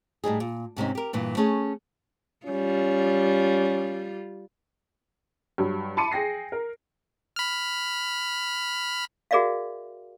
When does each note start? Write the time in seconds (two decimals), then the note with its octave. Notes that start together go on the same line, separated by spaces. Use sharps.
0.24 A2 G3 D#4 G#4
0.40 A#2
0.77 G#2 C3 C#4 D#4
0.95 G4 A#4
1.13 G2 A#2 E3
1.37 A3 C#4 G#4 G#5
2.46 G3 C#4 F4
5.58 G2 F#3
5.97 A5 B5 C6 D6 C#7 D#7
6.12 G#4 G5 A#6 C7
6.52 A#4
7.36 B5 F6
9.31 F#4 G#4 A#4 D5 E5 F5